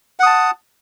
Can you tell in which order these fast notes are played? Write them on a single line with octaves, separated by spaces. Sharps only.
F#5 D#6 A5